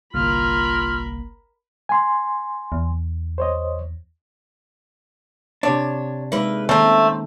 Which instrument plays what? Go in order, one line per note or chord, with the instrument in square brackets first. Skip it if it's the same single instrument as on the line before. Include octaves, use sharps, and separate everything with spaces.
[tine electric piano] G1 C2 A#3 [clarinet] F4 [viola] A#4 B5 [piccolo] F6
[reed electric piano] G#5 C6
[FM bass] E2
[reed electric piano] C5 C#5 D#5
[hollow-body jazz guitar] C3 D4 [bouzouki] C#5
[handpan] G#3 D#4 E5 [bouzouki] A#3 B4
[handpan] D#3 A#3 C#4 [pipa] A3 [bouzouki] C4 A#5